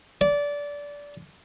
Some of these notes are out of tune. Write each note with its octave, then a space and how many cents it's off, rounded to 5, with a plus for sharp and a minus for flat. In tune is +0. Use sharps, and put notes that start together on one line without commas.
D5 -20